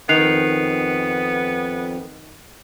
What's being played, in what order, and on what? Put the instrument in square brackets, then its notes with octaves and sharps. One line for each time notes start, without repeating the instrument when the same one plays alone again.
[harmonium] F2 [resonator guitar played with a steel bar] D#3 [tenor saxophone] B3 [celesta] F#6 C7 F7